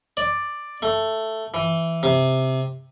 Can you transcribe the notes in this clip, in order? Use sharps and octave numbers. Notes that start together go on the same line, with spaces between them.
D5
A3
E3
C3